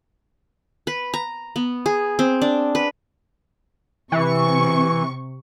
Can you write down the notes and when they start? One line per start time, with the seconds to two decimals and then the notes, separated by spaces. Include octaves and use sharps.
0.87 B4
1.14 A#5
1.56 B3
1.86 G#4
2.19 C4
2.42 D4
2.75 B4
4.12 C3 E3 C#6